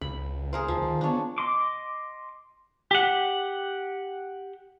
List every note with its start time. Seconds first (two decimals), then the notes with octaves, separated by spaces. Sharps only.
0.01 C#2 B5
0.53 G#4 A#4 C5
0.68 D2 F3
0.82 D#3
1.01 B3 D4 C#5
1.38 D#5 C6 D6
2.91 G4 F#5